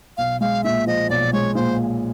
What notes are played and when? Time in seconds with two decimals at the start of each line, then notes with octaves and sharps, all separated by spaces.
0.17 B1 F5
0.41 G#3 F5
0.64 A#2 E5
0.87 F3 D#5
1.10 B1 D5
1.33 G#3 C#5
1.55 A#2 C5